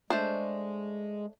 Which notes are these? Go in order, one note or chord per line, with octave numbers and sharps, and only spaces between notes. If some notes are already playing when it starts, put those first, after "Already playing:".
G#3 A3 D4 C5